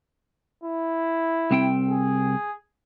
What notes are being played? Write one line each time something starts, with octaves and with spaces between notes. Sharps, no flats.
E4
C2 C4 G5
G#4